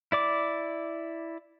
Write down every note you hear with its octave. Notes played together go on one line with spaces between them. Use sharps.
E4 D5 D6